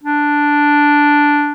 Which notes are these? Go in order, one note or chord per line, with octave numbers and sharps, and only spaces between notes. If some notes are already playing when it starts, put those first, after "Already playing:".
D4